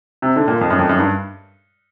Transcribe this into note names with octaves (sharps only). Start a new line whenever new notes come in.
C3
D3
A#2
F2
F#2
F2
F#2
G2